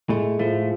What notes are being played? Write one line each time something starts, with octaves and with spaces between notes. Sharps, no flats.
A2 G#3 A3
A2 F3 A3